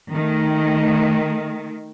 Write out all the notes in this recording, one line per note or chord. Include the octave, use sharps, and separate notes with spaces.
D#3 A3